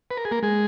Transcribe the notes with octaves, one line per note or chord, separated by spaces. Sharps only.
B4
A#4
G#4
A#3 A#4
G#3 G#4